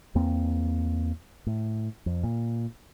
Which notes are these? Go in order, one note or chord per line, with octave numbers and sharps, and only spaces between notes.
E2 A#3 C4
A2
F2
A#2